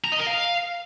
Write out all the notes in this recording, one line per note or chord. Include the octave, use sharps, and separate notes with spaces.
A#5
D#5
A#4
F5